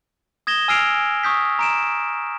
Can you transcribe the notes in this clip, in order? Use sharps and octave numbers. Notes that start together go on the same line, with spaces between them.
D#6 G#6 A#6 E7 G7
G#5 E6 F6 C7 D7 F7
C#6 D#6 G6 B6
A#5 D7 E7